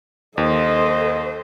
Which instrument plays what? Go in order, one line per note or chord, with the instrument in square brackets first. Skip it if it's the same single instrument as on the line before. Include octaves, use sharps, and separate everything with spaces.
[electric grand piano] D#2 [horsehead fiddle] A4 C5 [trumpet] D#5